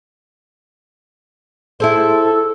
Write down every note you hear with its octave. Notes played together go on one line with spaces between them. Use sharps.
E4 G#4 A4 C5